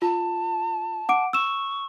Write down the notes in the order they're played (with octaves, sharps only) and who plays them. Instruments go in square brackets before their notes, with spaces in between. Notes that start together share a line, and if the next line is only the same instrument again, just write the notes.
[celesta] F4 [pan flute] A5
[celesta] F#5 D6 D7
[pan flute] C#6 [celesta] E6 E7